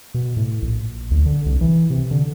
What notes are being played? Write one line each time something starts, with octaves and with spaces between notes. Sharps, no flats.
B2
A2
A#1
D2
D3
C2
E3
C3
D3